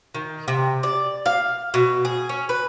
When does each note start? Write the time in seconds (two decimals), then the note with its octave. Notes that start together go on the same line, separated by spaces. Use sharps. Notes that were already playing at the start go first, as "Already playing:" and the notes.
0.15 D#3
0.48 C3
0.83 D5
1.26 F5
1.74 B2
2.05 G#4
2.29 C#4
2.49 B4